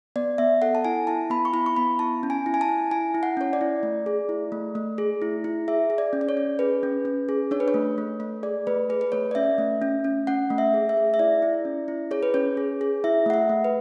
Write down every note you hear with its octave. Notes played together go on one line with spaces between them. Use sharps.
B3 D5
B3 E5
A4 F#5
A5
E4 G#5
E4 A5
B3 B5
C#6
E4 B5
C#6
B3 B5
E4 A5
C#4
G#5
E4
G#5
A5
E4
E4 G#5
E4
F#5
C#4 C#5
D5
E4
A3
G#4
E4
A3
A3
G#4
E4
E4
G#4 E5
G#4
D5
C#4
D5
C#5
C#4
G#4 B4
C#4
C#4
G#4
D4 C#5
B4
C#5
A3
A3
A3
G#4 D5
A3 B4
G#4 B4
B4
A3 C#5
D5
C#4 E5
A3
C#4
C#4
C#4 F#5
A3
E5
G#4
E5
G#4
E5
E4 D5
E4
C#4
E4
G#4 C#5
B4
C#4 C#5
G#4
G#4
E4 E5
A3 F#5
E5
A3
B4